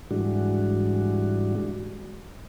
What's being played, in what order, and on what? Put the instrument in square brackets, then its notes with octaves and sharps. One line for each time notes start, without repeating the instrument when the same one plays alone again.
[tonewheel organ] G#2 E3 G3 G#3 D4 F#4